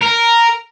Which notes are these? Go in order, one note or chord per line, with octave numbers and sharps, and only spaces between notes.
A#4